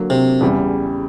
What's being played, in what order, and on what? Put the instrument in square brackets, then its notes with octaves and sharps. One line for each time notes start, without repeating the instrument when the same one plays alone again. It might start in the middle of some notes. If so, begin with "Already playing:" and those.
Already playing: [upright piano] D3 F#3 A#3
[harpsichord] C3
[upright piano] E2 C#3 E3 G3